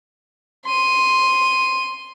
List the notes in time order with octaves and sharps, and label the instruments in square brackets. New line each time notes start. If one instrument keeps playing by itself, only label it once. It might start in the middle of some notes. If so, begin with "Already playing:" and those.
[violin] C6 D#7